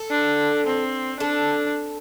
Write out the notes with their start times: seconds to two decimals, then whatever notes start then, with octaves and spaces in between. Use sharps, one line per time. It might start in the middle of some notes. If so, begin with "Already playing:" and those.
Already playing: A4
0.11 D4
0.66 C4
1.20 D4 A4